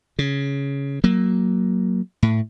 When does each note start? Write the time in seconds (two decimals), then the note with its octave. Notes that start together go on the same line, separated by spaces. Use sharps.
0.19 C#3
1.04 F#3 A#3
2.23 A2